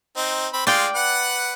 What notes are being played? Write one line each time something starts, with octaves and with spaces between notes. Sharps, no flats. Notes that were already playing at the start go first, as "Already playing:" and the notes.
C4 D#4
C4 B5
G#3 F4 D5 F5 G5
B4 F#5